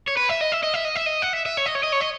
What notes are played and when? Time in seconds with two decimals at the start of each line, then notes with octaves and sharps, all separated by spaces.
0.08 C#5
0.17 B4
0.29 E5
0.41 D#5
0.52 E5
0.63 D#5
0.74 E5
0.84 D#5
0.95 E5
1.06 D#5
1.22 F#5
1.33 E5
1.46 E5
1.57 C#5
1.66 D#5
1.75 C#5
1.83 D#5
1.92 C#5
2.01 D#5